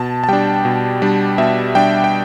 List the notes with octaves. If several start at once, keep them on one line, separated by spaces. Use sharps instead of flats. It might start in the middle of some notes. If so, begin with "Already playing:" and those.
Already playing: B2 A5
A5
G3 D4 G5
B2
G3 D4
B2 E5
G3 D4 G5
G5